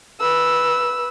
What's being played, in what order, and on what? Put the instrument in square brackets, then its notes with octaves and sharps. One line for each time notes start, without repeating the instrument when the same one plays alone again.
[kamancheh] B4 E6